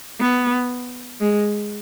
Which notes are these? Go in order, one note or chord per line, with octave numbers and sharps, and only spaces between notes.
B3
G#3